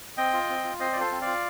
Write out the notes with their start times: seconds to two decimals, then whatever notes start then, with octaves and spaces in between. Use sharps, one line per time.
0.17 C4 D#5 G5
0.33 F4
0.49 C4
0.64 F4
0.80 C4 C5 D#5
0.93 D5
0.96 F4 A4 C5
1.12 C4
1.21 D5 F5
1.27 F4